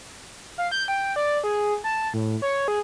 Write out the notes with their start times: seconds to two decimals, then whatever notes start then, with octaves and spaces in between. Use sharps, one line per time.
0.58 F5
0.72 G6
0.88 G5
1.16 D5
1.44 G#4
1.84 A5
2.14 A2
2.42 C#5
2.68 G#4